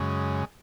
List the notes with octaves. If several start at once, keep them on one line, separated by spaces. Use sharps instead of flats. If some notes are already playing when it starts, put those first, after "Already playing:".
Already playing: F#2 C#3 G#3